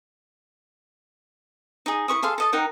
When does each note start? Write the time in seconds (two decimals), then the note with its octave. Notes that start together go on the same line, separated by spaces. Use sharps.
1.86 D#4 G#4
2.08 E4 B4 C#6 D#6
2.22 G#4 A4 F5 C6
2.38 A4 D#5 A5
2.53 D#4 A#4 F#5 G5